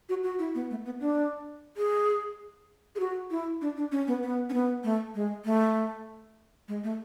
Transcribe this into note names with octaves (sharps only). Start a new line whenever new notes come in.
F#4
F#4
E4
B3
A3
B3
D4
G#4
G#4
F#4
E4
D4
D4
C#4
B3
B3
C#4
B3
A3
G#3
A3
G#3
A3